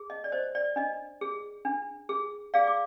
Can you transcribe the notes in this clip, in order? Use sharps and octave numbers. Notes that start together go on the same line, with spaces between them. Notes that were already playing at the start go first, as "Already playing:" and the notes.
Already playing: G#4
D#5
D5
C5 D#5
D5
D4 D#5
G#4
D4
G#4
G#4 D5 F5
D6